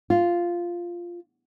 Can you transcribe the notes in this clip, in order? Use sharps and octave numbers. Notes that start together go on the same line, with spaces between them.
F4